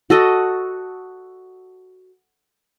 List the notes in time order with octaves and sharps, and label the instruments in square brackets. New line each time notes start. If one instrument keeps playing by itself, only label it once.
[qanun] F#4 A4 D#5